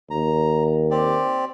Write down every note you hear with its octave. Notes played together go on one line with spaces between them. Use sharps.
D#2 A#5
C4 G4 D5